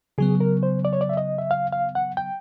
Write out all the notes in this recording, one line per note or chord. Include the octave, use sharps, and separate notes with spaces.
C#3 F#3 B3 G#4
A#4
C5
D5
C#5
D5
E5
D#5
E5
F5
F5
F#5
G5